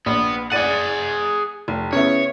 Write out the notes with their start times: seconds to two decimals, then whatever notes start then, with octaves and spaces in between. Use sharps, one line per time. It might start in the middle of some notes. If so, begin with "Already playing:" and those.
0.06 A#1 B3
0.52 G#4 D5 F#5 A6 D#7
1.68 F1
1.93 C#3 B3 E4 C#5